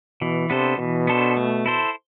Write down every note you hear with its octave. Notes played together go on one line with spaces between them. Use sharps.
B2 E3
C3 B3 D4 A4 C5
B2 E3
B3 D4 A4 C5
A3
E4 A4 C5